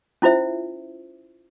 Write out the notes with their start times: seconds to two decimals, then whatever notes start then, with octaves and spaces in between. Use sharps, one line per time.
0.22 C#4 E4 F4 C5 E5